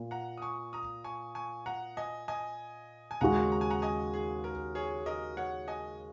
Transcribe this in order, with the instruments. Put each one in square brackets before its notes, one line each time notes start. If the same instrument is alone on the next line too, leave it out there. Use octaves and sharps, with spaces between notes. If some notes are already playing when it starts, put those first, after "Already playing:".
Already playing: [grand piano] A#2 A#3
[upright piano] F#5 A#5
D#6
G#5 C#6
A#5 D#6
G#5 C#6
G#5 C#6
F#5 A#5
D#5 G#5
D#5 G#5
G#5
[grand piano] D#2 C#3 G#3 C#4 F#4 [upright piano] F#5 A#5
[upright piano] A#5
G#5
F#5 A#5
D#5 G#5
G#4
A#4
G#4 C#5
A#4 D#5
C#5 F#5
D#5 G#5